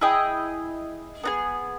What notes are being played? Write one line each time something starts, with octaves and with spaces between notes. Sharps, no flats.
E4 G#4 D#5 G5
B3 D#4 G#4